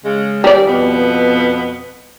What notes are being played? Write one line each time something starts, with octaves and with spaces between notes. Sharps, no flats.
C#3 G#3
D#3 G3 D5
F2 B2 B3